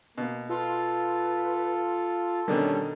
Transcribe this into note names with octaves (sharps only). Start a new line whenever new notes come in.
B2 A#3
F4 A4 B4
B2 D3 D#3 G3 C#4